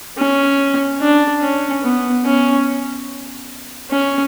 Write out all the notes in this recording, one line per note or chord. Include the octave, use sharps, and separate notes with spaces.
C#4
D4
C#4
B3
C#4
C#4